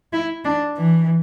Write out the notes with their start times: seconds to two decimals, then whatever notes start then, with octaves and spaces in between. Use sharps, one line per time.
0.13 E4
0.45 D4
0.78 E3